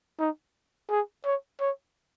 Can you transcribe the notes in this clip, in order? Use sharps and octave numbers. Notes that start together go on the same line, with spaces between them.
D#4
G#4
C#5
C#5